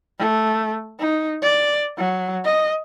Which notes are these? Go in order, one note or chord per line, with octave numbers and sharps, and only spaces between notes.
A3
D#4
D5
F#3
D#5